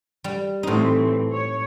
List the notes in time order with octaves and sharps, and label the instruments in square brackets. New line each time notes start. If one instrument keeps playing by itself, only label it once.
[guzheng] G3
[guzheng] A2 D#4 [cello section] E3 A3 C4
[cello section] C#5